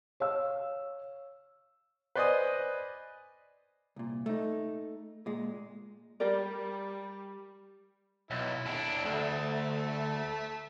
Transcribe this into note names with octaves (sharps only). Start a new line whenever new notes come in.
C#5 F5 E6
B4 C5 D5 D#5 G#5 D#6
C2 A#2
A3 D#4
A#2 G#3
G3 G4 A#4 D5
B1 E4
D#2 D4
D2 A3 E5 A5